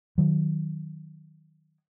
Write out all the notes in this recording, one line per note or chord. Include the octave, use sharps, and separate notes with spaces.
D#3 F#3